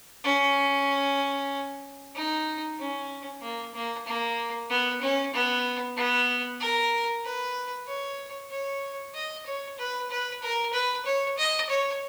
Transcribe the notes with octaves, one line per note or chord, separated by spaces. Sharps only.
C#4
D#4
C#4
A#3
A#3
A#3
B3
C#4
B3
B3
A#4
B4
C#5
C#5
D#5
C#5
B4
B4
A#4
B4
C#5
D#5
C#5